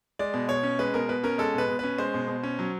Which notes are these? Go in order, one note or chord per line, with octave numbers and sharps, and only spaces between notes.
G#3 D5
B2
B2 C#5
C#4
G#3 B4
B2 A#4
B2 B4
C#4 A#4
G#3 A4
B2 B4
B2
C#4 B4
G#3 C5
B2
B2
C#4
F#3